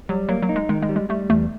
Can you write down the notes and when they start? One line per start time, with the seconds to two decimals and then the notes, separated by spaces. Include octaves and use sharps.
0.09 F#3 G3
0.29 F#3 A#3
0.42 F#3
0.49 D#4
0.56 G#3
0.69 D#3 G#3
0.82 G#3
0.89 G3
0.96 G#3
1.09 G3 A3
1.29 E2 A3